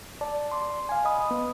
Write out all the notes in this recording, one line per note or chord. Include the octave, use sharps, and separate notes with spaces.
D5 A5
C6 D6
F5 G#5
D#5 B5 D#6
B3